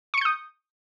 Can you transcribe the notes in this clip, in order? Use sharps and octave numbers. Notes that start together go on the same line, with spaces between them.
C#6 D#6 G6 C#7